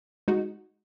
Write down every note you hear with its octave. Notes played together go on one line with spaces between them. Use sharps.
G#3 D#4 F#4